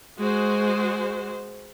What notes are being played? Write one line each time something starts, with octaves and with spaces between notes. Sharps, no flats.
G#3 F#4 C5